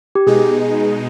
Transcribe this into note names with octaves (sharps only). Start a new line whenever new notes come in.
G4
B2 G#3 D#4 G#4